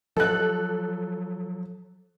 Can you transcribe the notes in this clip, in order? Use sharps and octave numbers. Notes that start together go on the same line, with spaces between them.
F3 F#3 A4 F#6